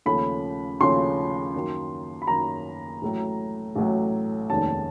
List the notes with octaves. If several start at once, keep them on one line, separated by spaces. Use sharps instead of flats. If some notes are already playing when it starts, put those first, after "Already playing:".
D#2 C#3 F3 A3 C#4 B5
D#2 C#3 F3 A3 C#4 C6
F#2 D#3 F#3 A#3
B5
F#2 D#3 F#3 A#3 A#5
A1 A2 F#3
A1 A2 F#3
F1 D#2 D#3 G#3 C#4 A5